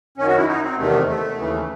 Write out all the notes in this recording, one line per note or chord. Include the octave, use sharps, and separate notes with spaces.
F#2 D#3 C#4
F#4
E4
D#4
C4
E2 C3 D#3 A3
A3
D#2 C#3 E3